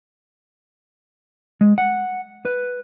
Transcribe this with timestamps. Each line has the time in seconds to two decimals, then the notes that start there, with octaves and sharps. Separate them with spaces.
1.61 G#3
1.78 F#5
2.45 B4